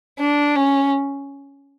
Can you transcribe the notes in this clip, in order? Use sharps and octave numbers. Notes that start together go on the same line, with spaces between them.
D4
C#4